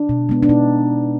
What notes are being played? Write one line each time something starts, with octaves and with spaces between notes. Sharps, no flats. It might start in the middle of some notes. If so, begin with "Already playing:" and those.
Already playing: D4
B2
G#3 B3
D4
B2 D#4